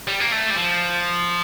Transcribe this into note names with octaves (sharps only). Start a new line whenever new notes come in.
G3
A#3
A3
G3
F3